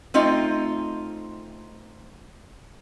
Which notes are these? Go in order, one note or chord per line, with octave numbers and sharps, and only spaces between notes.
A3 C4 D#4 F4 D#5